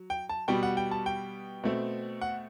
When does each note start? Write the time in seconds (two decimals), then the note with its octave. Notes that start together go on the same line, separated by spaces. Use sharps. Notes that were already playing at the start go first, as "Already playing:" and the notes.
Already playing: F#3
0.10 G5
0.29 A5
0.48 B2 G3 B3 G5
0.63 F#5
0.77 G5
0.91 A5
1.06 G5
1.64 B2 A3 C4
2.21 F#5